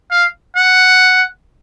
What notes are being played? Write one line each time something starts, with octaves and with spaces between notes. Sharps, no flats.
F5
F#5